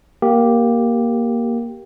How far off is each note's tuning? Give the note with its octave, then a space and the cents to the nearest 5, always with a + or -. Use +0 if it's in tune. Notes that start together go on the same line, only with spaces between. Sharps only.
A#3 +10 G4 +0